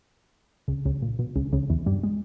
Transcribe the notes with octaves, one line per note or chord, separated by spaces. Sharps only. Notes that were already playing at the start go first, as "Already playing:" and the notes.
C#2 C#3
C#2 C#3
A#2
B2
C#2 C#3
C#2 C#3
E2 E3
G2 G3
G#3